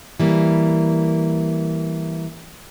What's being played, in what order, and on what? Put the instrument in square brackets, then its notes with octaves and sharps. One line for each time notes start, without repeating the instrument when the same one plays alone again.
[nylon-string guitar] E3 G3 A#3